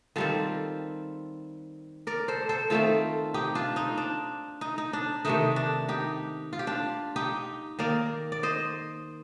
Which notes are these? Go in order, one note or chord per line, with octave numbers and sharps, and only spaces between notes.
D#3 G3 C4 F4 A4
A#4 D5
A4 C5
A4 C5
D#3 A3 C4 F4 A4
D#4 G4
D4 F4
D#4
D4
D#4
D#4
D4
C3 D#3 A3 D#4
D4
D#4 G4
F4
G4
D4 F4
D#4 G4
D#3 A#3 A#4 D5
D5
C5 D#5